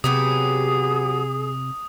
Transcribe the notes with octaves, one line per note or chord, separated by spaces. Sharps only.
C3 F#3 B3 G4 G#4 D#6